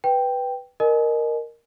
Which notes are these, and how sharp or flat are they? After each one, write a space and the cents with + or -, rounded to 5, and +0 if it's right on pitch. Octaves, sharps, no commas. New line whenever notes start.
B4 +0 G5 +0
A#4 +0 D#5 -25 G#5 +30